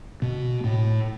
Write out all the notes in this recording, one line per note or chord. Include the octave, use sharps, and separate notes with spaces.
B2
A2